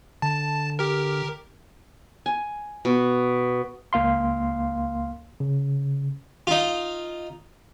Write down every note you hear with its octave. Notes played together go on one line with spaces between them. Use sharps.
D3 A5
G4 A#4
G#5
B2
C#2 A#3 F5 C6
C#3
D#4 F4